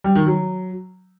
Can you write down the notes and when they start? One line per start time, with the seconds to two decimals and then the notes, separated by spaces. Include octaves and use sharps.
0.04 G3
0.15 D#3
0.26 F#3